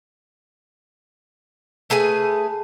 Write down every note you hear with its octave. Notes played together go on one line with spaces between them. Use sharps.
A3 G#4 B4 G#5